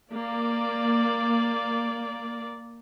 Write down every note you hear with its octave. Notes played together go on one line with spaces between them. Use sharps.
A#3 D5